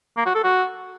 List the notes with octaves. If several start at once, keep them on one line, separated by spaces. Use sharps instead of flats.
A#3
F#4
A4
F#4